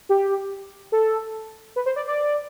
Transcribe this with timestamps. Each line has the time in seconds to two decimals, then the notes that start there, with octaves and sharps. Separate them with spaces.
0.09 G4
0.92 A4
1.76 B4
1.86 C5
1.96 D5
2.07 D5